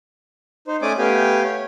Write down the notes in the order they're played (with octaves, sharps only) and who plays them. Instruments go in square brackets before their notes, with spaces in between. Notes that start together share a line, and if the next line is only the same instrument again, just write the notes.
[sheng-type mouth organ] D#4 C5
A3 C#4 D5 G#5 D6 D#6
A3 B3 G4 F5 G5 G#5
C#5